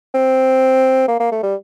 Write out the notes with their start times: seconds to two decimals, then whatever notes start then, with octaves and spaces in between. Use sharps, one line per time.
0.14 C4
1.08 A#3
1.20 A#3
1.32 A3
1.43 G3